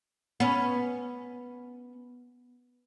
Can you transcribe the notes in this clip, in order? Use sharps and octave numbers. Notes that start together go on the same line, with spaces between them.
B3 C#4